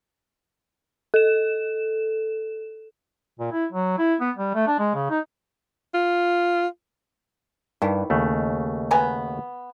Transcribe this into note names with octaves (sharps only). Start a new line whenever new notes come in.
A4 E7
A#2
E4
F#3
E4
B3
G3
A3
D4
G#3
C#3
D#4
F4
G2 D#3 E3
D#2 C#3 A3
B3 G#5 A#5